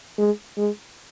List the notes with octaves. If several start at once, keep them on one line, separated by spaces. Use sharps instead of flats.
G#3
G#3